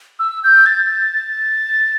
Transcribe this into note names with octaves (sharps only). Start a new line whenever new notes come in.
E6
G6
A6